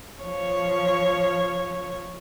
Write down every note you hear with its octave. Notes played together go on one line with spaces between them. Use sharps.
F3 C#5